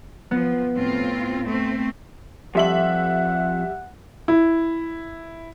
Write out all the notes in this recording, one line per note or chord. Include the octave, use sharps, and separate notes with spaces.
F3 B3
A2 C4 F4
A3 C4
F2 G3 E5 F#5 F#7
E4